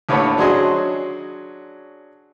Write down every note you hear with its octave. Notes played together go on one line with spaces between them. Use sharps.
D#2 A2 D3 B4 C#5
F#3 C#4 D4 G#4 C5 D#5